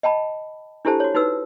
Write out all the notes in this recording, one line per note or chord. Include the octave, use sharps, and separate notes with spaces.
D#5 G5 A5 B5
D4 E4 G4 A4 C5 A5
F#4 C#5
D#4 F#4 B4 E6